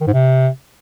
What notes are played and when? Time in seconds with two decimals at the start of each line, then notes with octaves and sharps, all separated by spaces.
0.01 D#3
0.07 G#2
0.13 C3